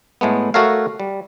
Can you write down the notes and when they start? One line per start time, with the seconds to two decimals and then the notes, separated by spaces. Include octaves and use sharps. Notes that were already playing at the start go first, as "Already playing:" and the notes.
0.21 A2 G#3 A3 B3
0.54 A3 F#4 A4 A#4 C#5 F5
1.00 G3